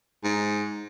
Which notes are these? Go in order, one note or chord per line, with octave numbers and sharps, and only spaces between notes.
G#2